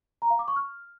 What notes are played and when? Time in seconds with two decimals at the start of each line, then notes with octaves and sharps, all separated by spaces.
0.22 A#5
0.30 F5
0.39 D6
0.48 C#6
0.56 F6